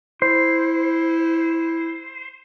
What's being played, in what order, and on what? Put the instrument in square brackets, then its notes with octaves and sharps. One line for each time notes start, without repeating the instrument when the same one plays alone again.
[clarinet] E4 [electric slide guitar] C5